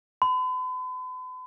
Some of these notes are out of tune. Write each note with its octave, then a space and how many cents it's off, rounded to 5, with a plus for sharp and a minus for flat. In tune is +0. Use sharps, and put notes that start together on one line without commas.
B5 +45